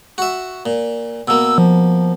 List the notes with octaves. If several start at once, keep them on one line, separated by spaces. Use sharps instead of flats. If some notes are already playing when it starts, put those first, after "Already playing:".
F#4 E5
A#2
B2 A#3 E6
F3